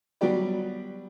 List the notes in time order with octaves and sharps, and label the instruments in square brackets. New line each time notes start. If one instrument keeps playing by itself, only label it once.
[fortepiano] F#3 G3 B3 G4 D5